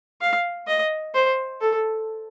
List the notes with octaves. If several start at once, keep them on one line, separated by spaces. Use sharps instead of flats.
F5
D#5
C5
A4